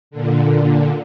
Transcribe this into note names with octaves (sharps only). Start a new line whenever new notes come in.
A#2 D3